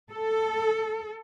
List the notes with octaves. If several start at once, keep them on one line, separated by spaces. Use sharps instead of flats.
A4